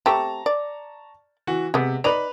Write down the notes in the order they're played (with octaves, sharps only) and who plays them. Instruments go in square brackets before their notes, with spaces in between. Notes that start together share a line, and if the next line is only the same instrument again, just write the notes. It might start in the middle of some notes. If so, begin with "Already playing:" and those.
[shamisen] A3 C4 G4 [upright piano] A5 A#5 C#6
[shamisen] D5
[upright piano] E3 F#4
[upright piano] C3 [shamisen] G#3 B3
[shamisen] D#4 D5 [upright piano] B4 B5 F7